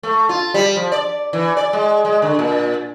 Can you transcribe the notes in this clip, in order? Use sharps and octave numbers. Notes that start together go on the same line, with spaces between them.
A3
F4
G3
F3
D5
E3
D5
G#3
G#3
D3
A#2